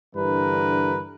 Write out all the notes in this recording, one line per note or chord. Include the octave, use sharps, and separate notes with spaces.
G2 D3 E3 D4 A#4 B4